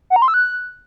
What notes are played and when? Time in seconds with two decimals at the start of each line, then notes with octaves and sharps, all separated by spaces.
0.10 F#5
0.16 A#5
0.22 C6
0.28 E6
0.34 F#6